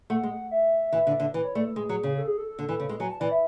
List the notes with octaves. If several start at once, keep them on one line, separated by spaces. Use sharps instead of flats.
A3 F#5
G#3
E5
E3
D3
D3
E3 B4
C#5
A3 D5
A4
G#3 G#4
F#3
C#3
A4
G#4
A4
A4
D3
E3
C#3
G#3
F#3 G#5
A5
E3 D5
E5